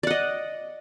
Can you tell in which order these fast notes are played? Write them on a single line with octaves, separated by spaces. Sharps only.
D5 F#5 D#5